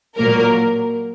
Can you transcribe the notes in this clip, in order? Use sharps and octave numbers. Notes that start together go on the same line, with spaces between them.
A#2 F#3 A#3 A#4